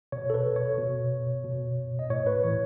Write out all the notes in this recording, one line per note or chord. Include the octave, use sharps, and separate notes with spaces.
B2 C#5
A4
B4
C#5
B2
B2
D#5
A2 C#5
B4
E3 C#5